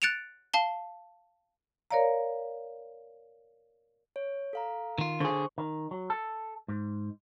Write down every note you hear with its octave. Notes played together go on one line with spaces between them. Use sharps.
F#6 A6 C#7 D7 E7 F7
F5 A5 G7
A#4 C#5 D5 F5 A#5
C#5
A4 F5 A#5
D#3 F4
D3 G#4 C5 C6 C#6
D#3
F#3
A4
G#2